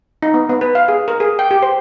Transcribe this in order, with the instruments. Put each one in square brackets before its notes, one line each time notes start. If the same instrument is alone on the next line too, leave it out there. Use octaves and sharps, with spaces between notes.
[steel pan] D#4
B3
B3
B4
F5
G#4
A#4
G#4
G5
G4
C5